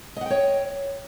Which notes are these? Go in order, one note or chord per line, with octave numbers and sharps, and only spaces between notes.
C#5 D#5 F#5 G5